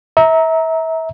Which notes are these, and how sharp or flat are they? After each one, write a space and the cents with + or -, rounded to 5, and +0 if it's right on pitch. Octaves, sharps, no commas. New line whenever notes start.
E5 -30 A#5 +0